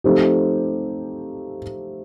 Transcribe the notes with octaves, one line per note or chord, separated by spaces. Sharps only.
F3 A3 C4 D#4 G4